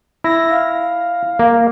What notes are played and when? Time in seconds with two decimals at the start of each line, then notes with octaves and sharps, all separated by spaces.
0.24 E4 A#6
0.51 F5
1.39 A#3